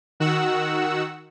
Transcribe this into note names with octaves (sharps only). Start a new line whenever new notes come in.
D#3 F#4 F#5 E6